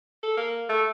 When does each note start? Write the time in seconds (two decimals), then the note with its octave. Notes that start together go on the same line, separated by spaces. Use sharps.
0.23 A4
0.37 A#3
0.69 A3